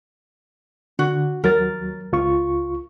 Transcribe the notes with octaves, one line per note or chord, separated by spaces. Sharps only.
D3 F#4
D#2 F#3 A#4 A6
C#2 F4 C#6